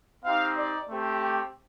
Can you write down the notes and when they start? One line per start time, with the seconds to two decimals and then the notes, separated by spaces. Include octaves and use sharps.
0.24 C4 D#4 G4 F5
0.58 D5
0.90 A3 C4 G4